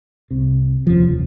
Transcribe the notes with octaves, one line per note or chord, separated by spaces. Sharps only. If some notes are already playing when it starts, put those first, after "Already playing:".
C2 C3
F1 D#2 C#3 F3